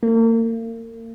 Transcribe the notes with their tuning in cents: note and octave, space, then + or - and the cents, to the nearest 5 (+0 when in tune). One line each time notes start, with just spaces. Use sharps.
A#3 -40